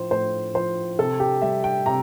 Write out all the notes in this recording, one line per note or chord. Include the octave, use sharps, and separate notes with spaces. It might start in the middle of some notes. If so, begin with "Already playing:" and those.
Already playing: A2 F3 C5
A2 C5
F3 C5
C3 A4
G4
G3 E5
G5
C3 A#5